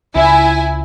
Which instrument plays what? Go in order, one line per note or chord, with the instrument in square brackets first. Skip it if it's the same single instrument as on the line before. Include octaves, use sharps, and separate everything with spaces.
[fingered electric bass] C#2 [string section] E4 G#5